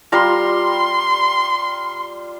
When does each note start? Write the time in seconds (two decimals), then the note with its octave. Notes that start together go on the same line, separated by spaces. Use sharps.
0.12 G3 F4 A#5 C6